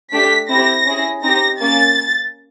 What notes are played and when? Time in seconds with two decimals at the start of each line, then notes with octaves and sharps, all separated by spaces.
0.12 A3 D4 G4 B6
0.49 C4 E4 G4 A#6
0.86 C#4 E4 G#4
1.23 C4 D#4 G4 A#6
1.60 A#3 C#4 A6